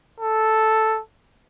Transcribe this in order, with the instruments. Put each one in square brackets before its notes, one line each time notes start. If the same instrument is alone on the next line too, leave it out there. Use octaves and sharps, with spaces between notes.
[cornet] A4